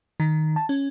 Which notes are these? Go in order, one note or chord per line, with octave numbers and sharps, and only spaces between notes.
D#3
A5
C#4